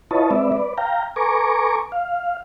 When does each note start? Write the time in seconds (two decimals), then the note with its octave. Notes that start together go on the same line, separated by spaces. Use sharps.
0.11 E4 F4 B4 C#5 D#5 A5
0.31 G#3 C4 B4 D5 E5
0.52 B4 D5
0.78 F5 G5 A#5
1.16 A4 B4 G#5 A#5 C#6 D6
1.92 F5